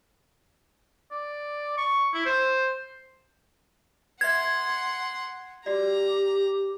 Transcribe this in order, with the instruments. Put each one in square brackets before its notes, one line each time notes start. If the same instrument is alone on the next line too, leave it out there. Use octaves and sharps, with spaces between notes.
[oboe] D5
C#6
E4
C5
[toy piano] B4 E5 [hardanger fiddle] F#5 C6 [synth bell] G#6
[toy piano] F#4 D5 [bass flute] G4 [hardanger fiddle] A#5